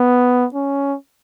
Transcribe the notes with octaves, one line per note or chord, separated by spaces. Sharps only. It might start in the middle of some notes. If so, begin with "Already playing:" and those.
Already playing: B3
C#4